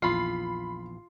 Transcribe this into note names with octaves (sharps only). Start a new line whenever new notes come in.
A#1 E2 F4 B5 C7